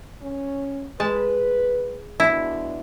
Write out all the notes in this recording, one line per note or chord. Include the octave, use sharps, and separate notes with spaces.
C#4
G#3 B4 A5
B2 G#3 D4 E4